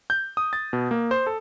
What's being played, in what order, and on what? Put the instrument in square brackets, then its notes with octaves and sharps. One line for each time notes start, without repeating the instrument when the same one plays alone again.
[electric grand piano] G6
D#6
A6
B2
A#3
C5
A4